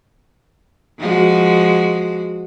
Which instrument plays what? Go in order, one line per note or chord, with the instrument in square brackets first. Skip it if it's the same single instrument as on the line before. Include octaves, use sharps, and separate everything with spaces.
[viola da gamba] F3 G#3 F#4